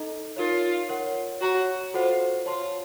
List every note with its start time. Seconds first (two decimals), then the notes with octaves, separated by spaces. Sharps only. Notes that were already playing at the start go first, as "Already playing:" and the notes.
Already playing: D#4 A4 D#5 A#5
0.36 D#4 F4 A#4 C#5
0.89 A#4 C#5 F#5
1.41 F#4 C#5 F#5 A#5
1.94 F4 F#4 A4 C5 F#5
2.46 F4 C#5 A5 C6